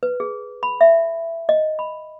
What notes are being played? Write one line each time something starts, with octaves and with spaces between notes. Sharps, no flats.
B4
G#4
B5
E5
D#5
B5